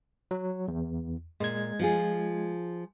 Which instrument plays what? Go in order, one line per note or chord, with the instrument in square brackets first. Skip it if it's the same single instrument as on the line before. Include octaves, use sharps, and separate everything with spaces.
[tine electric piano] F#3
E2
[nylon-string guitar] A#2 [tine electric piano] G#3 G#6
[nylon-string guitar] F3 F4 G#4